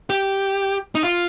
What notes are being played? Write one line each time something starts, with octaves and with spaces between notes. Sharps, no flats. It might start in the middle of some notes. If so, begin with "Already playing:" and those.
G4
D#4
F4